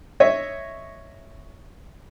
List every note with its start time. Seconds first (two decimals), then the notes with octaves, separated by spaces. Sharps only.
0.20 C#5 D#5 E5